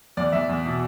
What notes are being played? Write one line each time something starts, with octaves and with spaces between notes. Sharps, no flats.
E2 D5
E2 E5
E2
B2